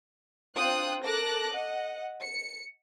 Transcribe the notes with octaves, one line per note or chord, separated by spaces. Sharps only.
C4 D4 F4 G5 D#6 F#6
A4 A#4 A5 D6 F#6 A#6
D#5 F#5
C#7